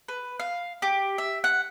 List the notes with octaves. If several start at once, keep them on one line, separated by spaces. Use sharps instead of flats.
B4
F5
G4
E5
F#5